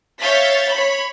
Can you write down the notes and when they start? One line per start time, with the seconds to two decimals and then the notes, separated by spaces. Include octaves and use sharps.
0.20 C#5 E5 F5 G6 A6 B6
0.70 C#5 B5